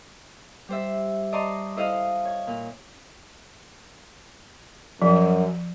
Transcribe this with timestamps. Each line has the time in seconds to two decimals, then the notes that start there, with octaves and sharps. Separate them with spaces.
0.68 G3 C5 E5
1.32 D5 D#5 A5 A#5 C6 C#6
1.76 E4 A4 C5 D#5 F5
2.25 C#5
2.47 A#2
5.02 F#2 F3